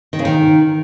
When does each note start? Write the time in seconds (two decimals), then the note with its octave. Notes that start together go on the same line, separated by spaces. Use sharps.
0.13 D#3
0.19 C#3
0.25 D#3